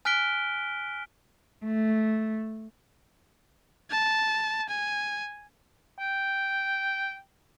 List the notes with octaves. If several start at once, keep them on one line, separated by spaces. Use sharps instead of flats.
G#5 F6 F#6 B6 D7 G7
A3
A5
G#5
G5